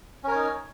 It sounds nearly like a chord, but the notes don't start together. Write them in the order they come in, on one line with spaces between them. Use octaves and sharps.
C#4 A#4 C#5 D#4